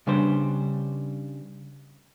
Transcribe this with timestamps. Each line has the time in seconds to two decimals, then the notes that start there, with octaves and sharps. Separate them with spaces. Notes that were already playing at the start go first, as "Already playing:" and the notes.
0.07 C#3 G3 D4 B4 C5